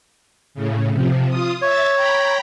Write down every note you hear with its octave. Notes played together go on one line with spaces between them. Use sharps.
A2 C#3
C3 F3
F4 D#6
C#5 E5 A6
G5 A#5 B5